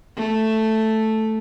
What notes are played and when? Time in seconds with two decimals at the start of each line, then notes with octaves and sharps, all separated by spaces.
0.16 A3